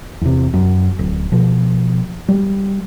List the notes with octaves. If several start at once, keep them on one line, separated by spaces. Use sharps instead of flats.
E2 C3
F#2
D1
B2 F3
G3